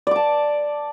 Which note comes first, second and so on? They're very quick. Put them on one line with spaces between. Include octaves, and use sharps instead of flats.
D5 D6 A5